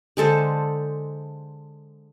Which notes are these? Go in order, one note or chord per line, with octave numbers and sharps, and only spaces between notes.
D3 G#3 A4 C5